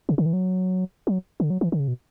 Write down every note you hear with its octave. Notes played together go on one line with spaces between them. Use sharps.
C#3
D3
E3
F#3
F#3
D3
F#3
E3
D3
C#3
B2